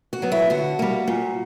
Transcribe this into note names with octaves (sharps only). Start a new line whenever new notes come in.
F#4
F#3 B3
E4
D3 F#4
G3 A#3
A#2